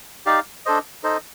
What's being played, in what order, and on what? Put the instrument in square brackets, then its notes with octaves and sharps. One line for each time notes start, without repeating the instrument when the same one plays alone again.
[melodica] D#4 G4 D5 F5
D4 A4 C5 D#5
D#4 A4 C5 D#5